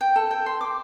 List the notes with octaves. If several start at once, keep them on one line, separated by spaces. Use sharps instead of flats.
G5
A4
G5
C6
D6